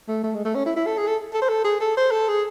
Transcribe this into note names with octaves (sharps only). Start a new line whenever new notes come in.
A3
A3
G#3
A3
C#4
E4
E4
A4
G#4
A4
A4
C5
A4
G#4
A4
C5
A4
G#4